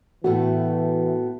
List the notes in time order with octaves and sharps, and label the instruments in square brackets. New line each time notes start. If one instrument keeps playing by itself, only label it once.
[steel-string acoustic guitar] A2 A3 B3 [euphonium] E3 [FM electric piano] F#4